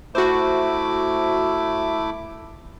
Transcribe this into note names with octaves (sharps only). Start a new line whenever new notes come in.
A3 E4 F#4 C5 D6